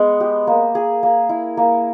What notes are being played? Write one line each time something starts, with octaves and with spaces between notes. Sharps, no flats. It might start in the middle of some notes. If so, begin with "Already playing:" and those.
Already playing: G#3 B3
G4
A#3
G#4
A#3
E4
A#3